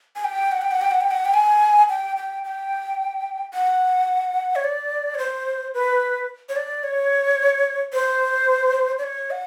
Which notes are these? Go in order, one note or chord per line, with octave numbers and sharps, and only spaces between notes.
G#5
G5
F#5
G5
F#5
G5
F#5
G5
F#5
G5
G#5
G5
G5
G5
F#5
C#5
D5
C#5
C5
B4
C#5
D5
C#5
C5
D5
C#5
F#5